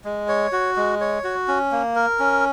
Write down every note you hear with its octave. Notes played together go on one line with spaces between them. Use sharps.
G#3
C#5
F#4
G#3
C#5
F#4
C#4
A#3
A#4
C#4